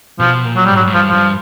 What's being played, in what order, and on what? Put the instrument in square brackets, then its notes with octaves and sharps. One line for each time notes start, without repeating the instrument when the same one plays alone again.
[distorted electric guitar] B2 [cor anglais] F3
[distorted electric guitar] A#2
[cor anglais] F#3
[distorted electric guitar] G#2 [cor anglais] G3
[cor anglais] F#3
[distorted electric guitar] G#2
[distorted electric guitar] G2 [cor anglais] F3
[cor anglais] F3
[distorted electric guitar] G2